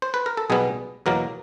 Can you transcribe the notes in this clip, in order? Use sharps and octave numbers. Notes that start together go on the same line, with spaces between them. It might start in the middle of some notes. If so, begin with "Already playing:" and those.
C5
B4
A#4
A4
B1 B2 G3 B3 G#4
E2 B2 F#3 A#3 A#4